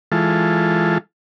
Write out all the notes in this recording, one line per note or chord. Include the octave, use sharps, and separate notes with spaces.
E3 G#3 F4 A4